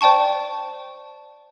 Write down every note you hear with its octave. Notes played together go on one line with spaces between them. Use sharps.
C5 D5 G5 A5 C#6